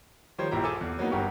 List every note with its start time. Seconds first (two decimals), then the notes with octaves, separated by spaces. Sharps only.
0.38 D#3 F3 G3 C5 C#5
0.51 A#1 D#2 E4 G4 A#5
0.64 F4 G#4 A4 G#5 D6 E6
0.81 E2
0.99 F#3 A#3 B3 D#4
1.11 G1 G2 F#4 G4 A#4 C#6